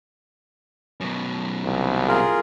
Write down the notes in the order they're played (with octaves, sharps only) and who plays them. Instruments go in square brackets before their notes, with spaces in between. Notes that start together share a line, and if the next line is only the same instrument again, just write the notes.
[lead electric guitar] F#2 B2
[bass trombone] C2
[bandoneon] F4 G#4 A#4